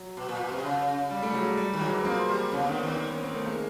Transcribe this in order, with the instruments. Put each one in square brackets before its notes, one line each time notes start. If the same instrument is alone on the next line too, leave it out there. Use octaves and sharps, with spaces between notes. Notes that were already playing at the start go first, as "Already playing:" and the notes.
Already playing: [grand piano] F#3
[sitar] B2
A#2
B2
C3
C#3
[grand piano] G3
G3 A3
F#3 G#3
G3
G3
[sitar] D#3
[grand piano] F#3 G#3
[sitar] E3
[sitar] F3 [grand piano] A#3 C4
[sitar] G3
[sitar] C#3 [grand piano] B3 C#4
[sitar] D3 [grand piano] A#3 C4
[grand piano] B3 C#4
[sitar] D#3 [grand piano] C4 D4
[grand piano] B3 C#4
A#3 C4
A3 B3
G#3 A#3